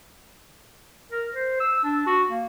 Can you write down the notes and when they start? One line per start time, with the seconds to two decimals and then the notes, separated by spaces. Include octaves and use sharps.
1.11 A#4
1.34 C5
1.60 E6
1.84 D4
2.06 F#4
2.30 A#3